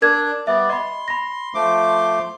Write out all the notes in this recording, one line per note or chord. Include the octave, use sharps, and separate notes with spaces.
D4 A#4 G#6
G3 B3 D5 E5
D#5 B5 C6
B5 A#6
F3 A3 D6